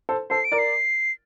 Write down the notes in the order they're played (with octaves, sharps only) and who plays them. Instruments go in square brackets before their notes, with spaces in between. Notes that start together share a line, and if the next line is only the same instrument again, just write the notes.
[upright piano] A4 C5
[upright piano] A4 C5 [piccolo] C7
[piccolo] D7
[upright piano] A#4 D5
[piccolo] C7